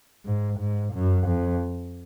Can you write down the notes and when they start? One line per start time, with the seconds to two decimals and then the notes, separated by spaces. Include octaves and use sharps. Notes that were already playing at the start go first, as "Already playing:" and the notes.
0.25 G#2
0.59 G#2
0.94 F#2
1.27 F2